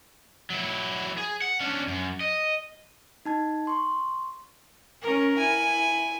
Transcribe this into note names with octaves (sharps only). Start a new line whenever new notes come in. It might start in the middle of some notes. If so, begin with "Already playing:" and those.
F#3 E4
G#4
F#5
C#4 D4
F#2
D#5
D#4 A5 G#6
C6 C#6
C#4 A#4
E4 G#5